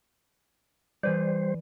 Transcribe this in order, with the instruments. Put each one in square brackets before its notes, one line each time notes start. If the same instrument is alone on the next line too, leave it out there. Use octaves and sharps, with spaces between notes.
[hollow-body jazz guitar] E3 B4 D5 [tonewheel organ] G3 C5